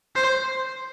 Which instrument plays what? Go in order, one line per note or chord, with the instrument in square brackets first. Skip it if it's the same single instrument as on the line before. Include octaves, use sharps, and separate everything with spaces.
[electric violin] C5